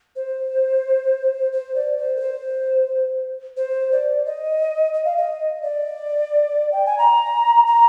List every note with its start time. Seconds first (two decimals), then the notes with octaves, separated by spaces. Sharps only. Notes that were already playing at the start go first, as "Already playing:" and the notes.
0.16 C5
1.53 C5
1.75 D5
1.97 C5
2.17 A#4
2.20 C5
3.57 C5
3.92 D5
4.26 D#5
4.94 D#5
5.05 F5
5.17 D#5
5.62 D5
6.72 G5
6.86 G#5
6.98 A#5
7.67 A#5